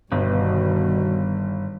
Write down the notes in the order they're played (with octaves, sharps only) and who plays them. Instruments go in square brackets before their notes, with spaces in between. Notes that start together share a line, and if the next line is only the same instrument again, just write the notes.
[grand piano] G1 [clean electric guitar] G2 [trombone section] B2 [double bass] D#3 G3